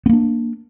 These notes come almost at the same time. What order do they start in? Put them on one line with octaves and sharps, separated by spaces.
B3 A#3 D4